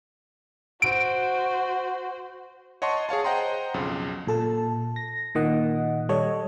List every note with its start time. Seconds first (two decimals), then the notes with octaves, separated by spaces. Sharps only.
0.82 F#4 C5 D7
2.82 C#5 D#5 F#5 A5 C6 C#6
3.09 G#4 C#5 F5 A5
3.24 C5 D#5 F#5 G5 A#5 C6
3.74 B1 F2 C#3
4.27 A#2 A4 A5
4.96 A#6
5.35 A#2 D#3 D#5 F#5
6.09 G3 A4 C#5 D#5